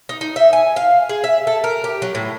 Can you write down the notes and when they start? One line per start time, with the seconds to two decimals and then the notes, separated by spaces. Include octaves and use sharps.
0.09 D#4
0.21 D#4
0.36 E5
0.53 G#5
0.76 F5
1.09 G#4
1.24 E5
1.47 A4
1.64 A#4
1.84 G4
2.02 F#3
2.15 A2